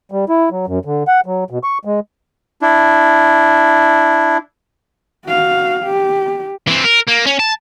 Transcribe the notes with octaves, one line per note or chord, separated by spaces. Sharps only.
G3
E4
F#3
F#2
D3
F#5
F#3
B2
C#6
G#3
D4 E4
F#4 F5
G4
E3 C4
A#4
A#3
C#4
A5